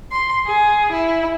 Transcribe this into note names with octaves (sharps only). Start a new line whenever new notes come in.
C6
G#4
E4